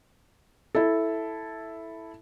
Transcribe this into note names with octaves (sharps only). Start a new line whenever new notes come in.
E4 A4